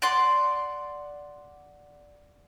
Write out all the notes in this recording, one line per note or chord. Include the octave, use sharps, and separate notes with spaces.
D5 F#5 C6